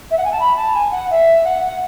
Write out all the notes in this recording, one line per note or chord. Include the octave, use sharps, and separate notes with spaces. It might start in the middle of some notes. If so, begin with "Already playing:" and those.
E5
F#5
G#5
A5
B5
A5
G#5
F#5
E5
F#5